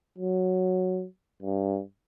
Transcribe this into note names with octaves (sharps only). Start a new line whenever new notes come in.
F#3
G2